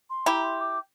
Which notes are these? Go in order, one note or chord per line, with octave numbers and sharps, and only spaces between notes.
C6
E4 G4 A#5
C6
D6